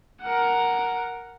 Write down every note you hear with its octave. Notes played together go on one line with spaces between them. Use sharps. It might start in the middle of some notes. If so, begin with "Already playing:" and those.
A#4 F#5